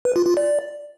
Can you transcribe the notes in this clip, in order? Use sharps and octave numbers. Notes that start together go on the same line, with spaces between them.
B4
F4
F4
D5